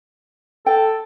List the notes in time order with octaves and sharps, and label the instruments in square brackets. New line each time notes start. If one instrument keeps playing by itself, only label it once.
[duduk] A4 [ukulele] G5